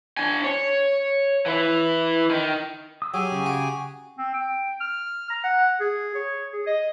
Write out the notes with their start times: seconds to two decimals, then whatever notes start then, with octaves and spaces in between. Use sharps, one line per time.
0.17 D4 G#5
0.44 C#5
1.46 E3 E4
2.30 D#3
3.02 D#6 E6
3.14 F#3 G4 G#4 G#5
3.32 C#3
3.46 F#4
4.18 C4
4.34 G5
4.80 F6
5.30 A#5
5.44 F#5
5.80 G#4
6.15 C#5
6.53 G#4
6.67 D#5